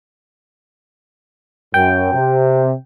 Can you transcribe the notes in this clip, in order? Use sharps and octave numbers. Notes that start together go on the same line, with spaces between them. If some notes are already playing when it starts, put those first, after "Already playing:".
F#2 G5
C3